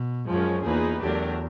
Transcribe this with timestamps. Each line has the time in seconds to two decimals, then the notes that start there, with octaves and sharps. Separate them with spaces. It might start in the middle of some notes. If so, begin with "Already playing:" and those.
Already playing: B2
0.27 F#2 F3 G#3 C#4
0.64 E2 F3 A#3 D#4 G#4 B4
1.01 E2 F#3 A3 D4 G4 A#4